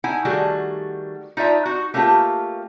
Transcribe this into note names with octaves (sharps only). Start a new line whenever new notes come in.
D#4 E4 F#5 G#5
D#3 G3 A3 F#4 G#4
D#4 F4 D5 E5 A#5
D#4 F#4
A3 A#3 C#4 F4 G4